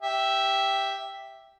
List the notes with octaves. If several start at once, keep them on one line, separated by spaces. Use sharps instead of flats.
G4 E5